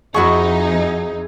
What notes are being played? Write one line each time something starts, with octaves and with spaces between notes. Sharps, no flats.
F2 D#4 E4 F#4 G#4 F#5 C#6